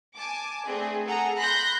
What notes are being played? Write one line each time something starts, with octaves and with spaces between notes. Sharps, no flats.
G#5 A5 D6
A3 C4 D4 G#4 B4
G#4 A4 F#5 A#5
B5 C6 F#6 G6 A#6